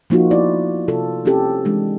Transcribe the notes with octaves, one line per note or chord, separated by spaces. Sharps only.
F3 A#3 D#4 F4 F#4
B3 E4 D5
C3 F4 A4
C4 C#4 E4 G4 A4
E3 G#3 D4